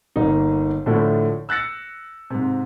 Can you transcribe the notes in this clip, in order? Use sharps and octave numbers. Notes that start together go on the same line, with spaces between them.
G1 A#3 D#4
A2 D3 F3 A3 E4
E6 F#6 A6 A#6 C#7
G#2 C3